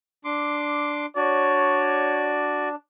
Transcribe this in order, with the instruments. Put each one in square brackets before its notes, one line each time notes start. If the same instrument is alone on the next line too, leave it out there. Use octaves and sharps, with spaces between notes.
[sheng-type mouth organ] D4 C6 D6
[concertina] D4 [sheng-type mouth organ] F#4 D5 [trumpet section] C#5